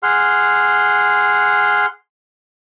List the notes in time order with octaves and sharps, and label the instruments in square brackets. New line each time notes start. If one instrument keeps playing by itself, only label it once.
[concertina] G#4 F#5 C6 F6